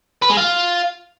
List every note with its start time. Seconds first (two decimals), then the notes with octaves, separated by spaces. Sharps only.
0.22 B4
0.30 G#3
0.37 F4